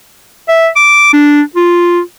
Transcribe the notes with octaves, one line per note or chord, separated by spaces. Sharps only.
E5
D6
D4
F4